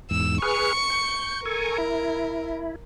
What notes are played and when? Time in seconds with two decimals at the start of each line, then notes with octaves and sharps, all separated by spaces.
0.11 E2 G#2 E6
0.42 G#4 B4 C#6 F6 C#7
0.90 G6
1.45 A4 A#4 G#5 C#6
1.78 E4